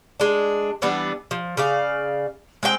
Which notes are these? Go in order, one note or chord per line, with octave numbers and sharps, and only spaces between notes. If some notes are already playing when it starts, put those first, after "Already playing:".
G#3 D4
E3 G3 B3 D4
F3
C#3 D5 F5
G#3 C4 D4 G5